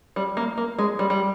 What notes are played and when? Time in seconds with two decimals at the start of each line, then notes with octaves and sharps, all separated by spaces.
0.16 G3
0.37 A#3
0.58 A#3
0.79 G#3
0.99 G3
1.10 G3